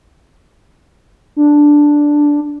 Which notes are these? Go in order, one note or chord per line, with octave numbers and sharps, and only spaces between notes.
D4